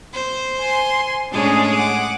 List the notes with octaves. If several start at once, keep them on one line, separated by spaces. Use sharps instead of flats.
C5
G#5 C6
A2 G#3 C#4 D4 G#4
F#5 D6